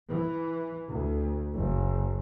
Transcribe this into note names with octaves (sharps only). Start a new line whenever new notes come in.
E3
D2
F#1